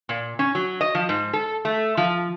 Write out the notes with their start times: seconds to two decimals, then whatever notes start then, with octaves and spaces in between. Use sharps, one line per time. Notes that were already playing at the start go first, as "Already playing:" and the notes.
0.09 A#2
0.39 C#4
0.55 F#3
0.81 D#5
0.95 F3
1.09 G#2
1.33 A4
1.65 A3
1.97 F3